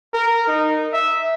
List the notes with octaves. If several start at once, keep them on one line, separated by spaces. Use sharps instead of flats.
A#4
D#4
E5